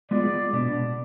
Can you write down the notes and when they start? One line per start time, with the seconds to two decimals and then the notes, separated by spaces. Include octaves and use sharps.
0.11 G#3 B3 F4 G#4 D5
0.53 B2 B3 D4